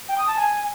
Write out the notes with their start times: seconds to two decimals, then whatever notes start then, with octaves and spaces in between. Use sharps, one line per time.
0.09 G5
0.18 D#6
0.27 A5
0.36 G#5